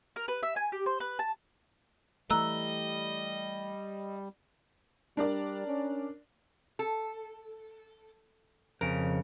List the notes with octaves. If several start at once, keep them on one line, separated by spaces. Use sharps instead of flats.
A#4
B4
E5
G#5
G4
C5
B4
A5
E3 G3 A3 D#5 A#5 E6 F#6
G3 D4 A#4 D5
C#4
A4
F2 C#3 A#4